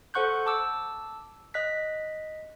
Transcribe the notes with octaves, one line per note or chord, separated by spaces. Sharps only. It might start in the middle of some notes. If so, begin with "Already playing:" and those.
A4 C5 F#5 C#6 F#6 G6
A5 D6 E6
D#5 F#6 B6